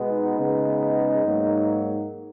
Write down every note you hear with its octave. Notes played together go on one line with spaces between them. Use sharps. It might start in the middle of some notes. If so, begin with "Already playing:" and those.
Already playing: B2 G#3 B3
D#4
C#3 G#3 B3
G#2 F#3 A#3